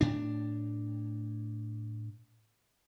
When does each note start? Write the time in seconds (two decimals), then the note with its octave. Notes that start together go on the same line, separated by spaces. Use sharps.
0.01 A2 D4